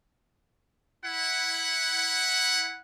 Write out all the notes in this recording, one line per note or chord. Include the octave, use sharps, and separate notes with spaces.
E4 F#5